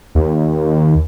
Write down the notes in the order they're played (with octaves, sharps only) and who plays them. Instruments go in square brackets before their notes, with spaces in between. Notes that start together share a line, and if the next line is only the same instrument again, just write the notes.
[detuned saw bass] D#2